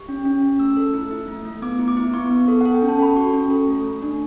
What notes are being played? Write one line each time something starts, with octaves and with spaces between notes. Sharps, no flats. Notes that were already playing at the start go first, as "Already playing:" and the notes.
Already playing: G4 C#6
C#4
C#4
C#4
A3 E6
A4
E4
E4
A3
A3
B3 D6
E4
D6
E4
B3 C#6
B3
A4
A4 F#5
G5
C#4
A5
A4 B5
F#4 C#6
C#4
A4
A3
A3
D4